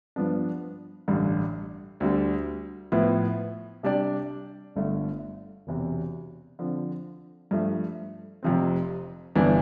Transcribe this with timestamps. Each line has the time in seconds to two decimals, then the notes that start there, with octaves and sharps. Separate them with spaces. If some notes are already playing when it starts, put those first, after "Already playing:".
0.16 G2 F3 B3 D4
1.08 A1 G2 D3
2.00 D2 D3 G3
2.92 A2 F3 B3 E4
3.83 C3 G3 D4 G4 D5
4.76 G1 G2 D3 A3
5.67 E1 E2 C3
6.59 D3 F3 C4
7.51 G2 F3 A3
8.43 F1 F2 C3 F3 C4
9.35 G1 G2 E3 B3 D4